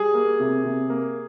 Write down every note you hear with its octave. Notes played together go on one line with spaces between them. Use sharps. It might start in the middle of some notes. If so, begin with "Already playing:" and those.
Already playing: G3 G#4
A#3
C3
C3
A#3